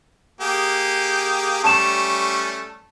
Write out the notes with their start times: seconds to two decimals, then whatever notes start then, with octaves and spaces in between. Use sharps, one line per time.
0.41 A#3 G4 G#4
1.64 G3 A3 C#4 A5 E7